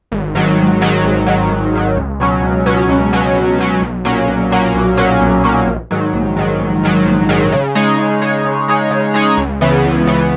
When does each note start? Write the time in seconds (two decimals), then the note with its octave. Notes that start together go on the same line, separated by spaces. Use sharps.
0.12 G#1
0.35 G#2 D#3 F#3
0.57 G#1
0.81 G#2 D#3 F#3
1.04 G#1
1.27 G#2 D#3 F#3
1.50 G#1
1.73 G#2 D#3 F#3
1.97 C#2
2.20 B2 F#3 C#4
2.42 C#2
2.66 B2 F#3 C#4
2.89 C#2
3.13 B2 F#3 C#4
3.36 C#2
3.58 B2 F#3 C#4
3.82 B1
4.05 A#2 F#3 A#3 C#4
4.28 B1
4.51 A#2 F#3 A#3 C#4
4.74 B1
4.97 A#2 F#3 A#3 C#4
5.21 B1
5.44 A#2 F#3 A#3 C#4
5.67 A#1
5.91 G#2 D#3 F#3
6.13 A#1
6.36 G#2 D#3 F#3
6.59 A#1
6.83 G#2 D#3 F#3
7.06 A#1
7.29 G#2 D#3 F#3
7.52 C#3
7.75 G#3 D#4 G#4 C#5
7.99 C#3
8.22 G#3 D#4 G#4 C#5
8.44 C#3
8.68 G#3 D#4 G#4 C#5
8.91 C#3
9.14 G#3 D#4 G#4 C#5
9.38 C#2
9.61 C#3 E3 B3
9.84 C#2
10.07 C#3 E3 B3